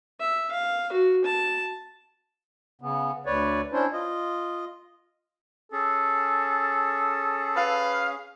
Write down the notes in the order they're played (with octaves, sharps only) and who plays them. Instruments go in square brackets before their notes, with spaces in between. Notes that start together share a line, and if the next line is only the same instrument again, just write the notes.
[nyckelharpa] E5
F5
F#4
A5
[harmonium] C#3 B3
D2 B4 C#5 D5
C#4 D4 E4 C5
F4 D#5
[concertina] C#4 G#4 [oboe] A4
[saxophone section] B4 F5